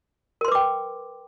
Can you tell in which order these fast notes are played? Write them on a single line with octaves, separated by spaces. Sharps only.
A#4 C6 B4 D6 G5